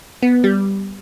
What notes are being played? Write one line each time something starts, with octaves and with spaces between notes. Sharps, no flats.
B3
G3